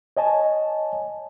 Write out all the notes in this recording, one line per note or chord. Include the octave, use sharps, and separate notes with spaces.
C#5 D#5 G#5 A5